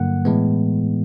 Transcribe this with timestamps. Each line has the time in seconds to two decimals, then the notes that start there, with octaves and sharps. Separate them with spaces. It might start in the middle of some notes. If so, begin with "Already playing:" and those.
Already playing: G2 D3 F#3 A#3 F#5
0.25 A2 E3 G#3 B3